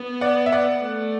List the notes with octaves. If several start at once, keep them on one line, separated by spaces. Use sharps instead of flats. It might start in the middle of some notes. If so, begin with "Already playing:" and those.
Already playing: B3
D5 F#5
E5
D5 F#5
A3